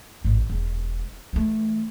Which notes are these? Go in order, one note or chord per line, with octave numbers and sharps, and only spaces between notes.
A1 G#2
E1
E3 A3